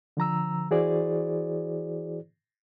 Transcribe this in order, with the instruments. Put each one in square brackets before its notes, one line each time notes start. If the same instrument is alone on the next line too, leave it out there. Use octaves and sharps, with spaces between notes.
[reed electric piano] D3 F3 A#5 E6
E3 E4 F#4 G#4 C5 D5